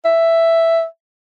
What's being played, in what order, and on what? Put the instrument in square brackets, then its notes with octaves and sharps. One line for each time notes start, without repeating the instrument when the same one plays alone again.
[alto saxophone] E5